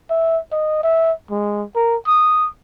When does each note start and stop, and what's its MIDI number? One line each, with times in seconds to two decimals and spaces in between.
0.10 0.39 76
0.52 0.79 75
0.83 1.12 76
1.31 1.64 56
1.76 1.96 70
2.07 2.48 87